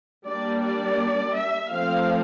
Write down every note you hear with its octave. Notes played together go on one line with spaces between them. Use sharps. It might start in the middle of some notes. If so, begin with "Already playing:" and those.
G3 A#3 D4 D5
D5
E5
F3 A3 C4 F5